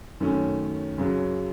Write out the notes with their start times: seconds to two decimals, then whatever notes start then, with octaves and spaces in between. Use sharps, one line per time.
0.20 F#2 D#3 A3 C#4
0.98 F#2 C#3 F#3